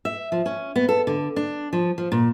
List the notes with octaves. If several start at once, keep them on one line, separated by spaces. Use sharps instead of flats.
E5
F3
C#4
B3
A4
D3
D4
F3
F3
A#2